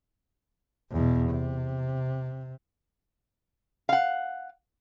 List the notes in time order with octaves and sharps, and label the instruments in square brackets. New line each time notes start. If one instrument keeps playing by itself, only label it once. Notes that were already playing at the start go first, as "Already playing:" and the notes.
[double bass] E2 B2
C3
[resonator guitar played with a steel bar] F5 F#5